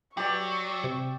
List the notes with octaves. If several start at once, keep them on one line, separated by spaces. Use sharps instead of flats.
F#3 G4 D5 C#6 E6
C3